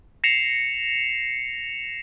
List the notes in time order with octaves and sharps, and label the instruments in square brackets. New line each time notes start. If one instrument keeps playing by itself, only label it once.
[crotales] A#6 C7 C#7 E7 F7